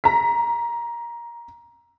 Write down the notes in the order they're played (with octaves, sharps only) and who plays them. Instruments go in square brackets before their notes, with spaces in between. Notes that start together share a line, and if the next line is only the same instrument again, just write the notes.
[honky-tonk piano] A#5 B6